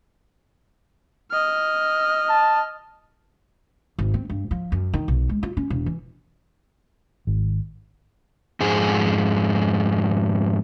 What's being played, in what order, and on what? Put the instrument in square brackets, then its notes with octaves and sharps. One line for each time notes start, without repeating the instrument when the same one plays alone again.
[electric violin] D#5 F6
[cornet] A5
[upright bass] G#1
C4
G2
F3
F#2
D#3
B1
G#3
F4
C#4
E1
E3
[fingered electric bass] G#1
[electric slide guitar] F2 G#2 G#4